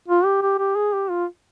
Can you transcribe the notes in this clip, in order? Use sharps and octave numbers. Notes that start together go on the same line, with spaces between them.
F4
G4
G4
G4
G#4
G4
F4